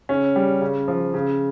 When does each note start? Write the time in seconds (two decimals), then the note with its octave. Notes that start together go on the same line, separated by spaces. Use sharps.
0.09 C#3 C#4
0.36 G3
0.61 C#3
0.88 F3
1.14 C#3